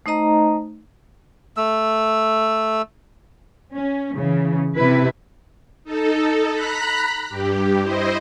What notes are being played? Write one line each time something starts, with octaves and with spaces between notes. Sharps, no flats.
A3 D#4 C5 D#5 A#5
A3 E6
C#4
C#3 E3
C3 E4 B4
D#4 A4
A#5 B5 F#6 B6
G2 G4
E4 C5 D#5